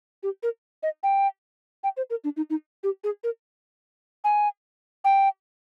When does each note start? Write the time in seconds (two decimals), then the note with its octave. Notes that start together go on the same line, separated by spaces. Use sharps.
0.23 G4
0.43 A#4
0.83 D#5
1.03 G5
1.83 G5
1.97 C5
2.10 A#4
2.24 D4
2.37 D#4
2.50 D#4
2.83 G4
3.04 G#4
3.24 A#4
4.24 G#5
5.04 G5